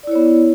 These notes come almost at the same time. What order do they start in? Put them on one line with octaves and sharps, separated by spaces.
D5 E4 C#5 B3